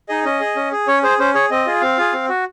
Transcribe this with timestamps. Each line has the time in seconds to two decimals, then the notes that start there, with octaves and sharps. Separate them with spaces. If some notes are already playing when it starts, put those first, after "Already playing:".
0.09 D#4 G#4 D#5
0.25 C#4 D#5
0.41 G#4
0.56 C#4
0.72 G#4
0.88 C#4 C#5
1.03 G#4 C5
1.19 C#4 C5
1.34 G#4 C#5
1.50 C4 D#5
1.66 F4 G#4
1.82 C4 F5
1.98 F4 G#4
2.13 C4
2.29 F#4